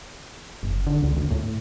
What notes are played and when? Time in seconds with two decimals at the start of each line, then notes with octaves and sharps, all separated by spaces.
0.63 F#1
0.87 D3
1.02 C#2
1.17 D2
1.31 A2